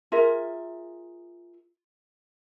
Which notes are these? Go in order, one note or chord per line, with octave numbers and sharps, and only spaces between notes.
F4 G#4 A#4 E5